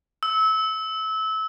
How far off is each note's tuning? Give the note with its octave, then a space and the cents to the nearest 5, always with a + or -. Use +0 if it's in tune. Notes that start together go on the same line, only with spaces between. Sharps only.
E6 -25